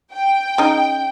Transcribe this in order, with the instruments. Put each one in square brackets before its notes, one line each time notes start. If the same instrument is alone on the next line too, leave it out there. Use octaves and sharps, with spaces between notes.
[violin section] G5
[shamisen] C#3 D#4